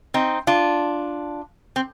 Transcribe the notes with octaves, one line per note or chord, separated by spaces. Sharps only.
C4 D#4
D4 F4
C4